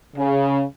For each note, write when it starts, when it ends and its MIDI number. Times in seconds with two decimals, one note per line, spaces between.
0.17 0.62 49